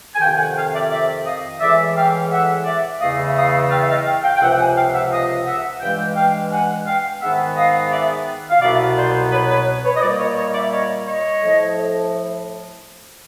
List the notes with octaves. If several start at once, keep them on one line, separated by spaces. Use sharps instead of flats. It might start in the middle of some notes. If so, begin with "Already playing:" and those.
G#5
F2 C3 D#3 F5 G5
F#5 G#5
F5 G5
D5 E5
D5 E5
D#5 F5
A2 E3 G#3 D5 E5
F5 G5
E5 F#5
D5 E5
E2 C#3 E3 A3 D#5 F5
E5
D#5 F5
F5 G5
E5
D#5 F5
F5 G5
F5 G5
G5
C#2 C3 F3 E5 F#5
F#5 G#5
F5 G5
E5 F#5
D#5 F5
E5 F#5
G2 E3 G#3 F5 G5
F5 G5
F#5 G#5
F5 G5
G#2 D#3 G#3 B3 E5 F#5
D#5 F5
D5 E5
F5
C2 B2 F#3 B3 D5 E5
C5 D5
B4 C#5
B4 C#5
B4 C#5
D#5
A#2 G3 A#3 C5 D5
C#5 D#5
C#5 D#5
D5 E5
C#5 D#5
C#5 D#5
A2 F3 A3